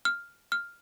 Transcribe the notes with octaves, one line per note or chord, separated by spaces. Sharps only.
F6
F6